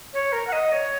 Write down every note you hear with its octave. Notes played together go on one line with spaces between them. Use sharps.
C#5
A#4
F#5
D#5
C#5